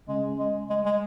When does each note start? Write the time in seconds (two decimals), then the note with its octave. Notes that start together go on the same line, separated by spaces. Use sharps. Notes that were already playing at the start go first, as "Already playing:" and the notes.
0.08 C#3 G#3
0.39 G#3
0.70 G#3
0.85 G#3